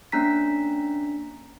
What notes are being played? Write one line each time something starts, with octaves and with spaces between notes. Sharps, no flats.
A#3 C#4 D4 A#5 B6